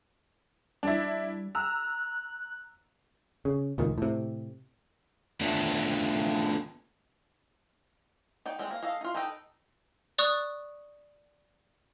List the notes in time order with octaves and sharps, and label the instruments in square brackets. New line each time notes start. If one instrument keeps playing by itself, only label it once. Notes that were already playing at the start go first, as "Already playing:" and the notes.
[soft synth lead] G3 [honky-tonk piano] D4 E4
[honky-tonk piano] A#5 E6 [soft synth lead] F#6
[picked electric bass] C#3
C#2 A#2 D#3
A2 C3
[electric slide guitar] A3 B3 D4 F4
[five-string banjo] D#4 D5 G5
G3 G#3 C4
A#3
A4 D#5 F5
D#4 F4
D#4 A4 B4 D#5 G5
[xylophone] D5 C#6 D#6 F#6